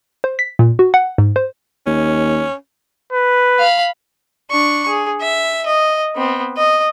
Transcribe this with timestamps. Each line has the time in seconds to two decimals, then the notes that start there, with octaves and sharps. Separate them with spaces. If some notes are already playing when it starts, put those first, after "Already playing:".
0.24 C5
0.39 B6
0.59 A#2
0.79 F#4
0.94 F#5
1.18 G#2
1.36 C5
1.86 D#2 C#4
3.13 B4
3.59 F5 B5
4.51 D4 C#6
4.88 G#4
5.21 E5
5.66 D#5
6.15 B3 C4
6.57 D#5